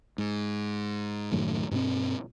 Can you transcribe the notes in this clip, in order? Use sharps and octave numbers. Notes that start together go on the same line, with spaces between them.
G#2
F#1 F#2 A2 D#3
G2 B2 B3 C4